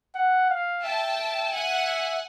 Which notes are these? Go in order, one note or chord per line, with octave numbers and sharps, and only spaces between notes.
F#5
F5
E5 G5 A5
E5 F#5 G#5